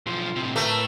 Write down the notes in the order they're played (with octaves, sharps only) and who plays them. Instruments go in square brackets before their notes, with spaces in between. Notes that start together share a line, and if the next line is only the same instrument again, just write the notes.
[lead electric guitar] B1 F3 [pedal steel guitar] F4
[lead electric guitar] A2 C3
[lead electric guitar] A2 [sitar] A3 [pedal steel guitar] A#4 B4 A#5